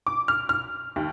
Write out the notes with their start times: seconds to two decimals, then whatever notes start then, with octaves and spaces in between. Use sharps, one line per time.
0.07 D6
0.28 F6
0.49 F6
0.96 D#2